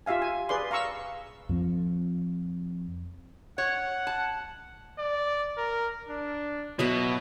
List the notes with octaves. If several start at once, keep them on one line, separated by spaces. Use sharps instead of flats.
F4 G4 E5 F5 G#5
G#5
G#4 B4 D5 C6
F5 A#5 C#6 E6
F2 F3 C4
C#5 F#5
A5
D5
A#4
D4
B2 F#3 B3 E4 B4